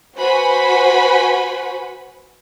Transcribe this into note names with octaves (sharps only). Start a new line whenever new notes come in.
F#4 B4 C5 F#5 G#5 B5